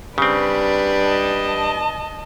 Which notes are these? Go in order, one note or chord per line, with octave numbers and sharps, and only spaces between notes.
C#3 G3 C4 D4 B4
D#5 A5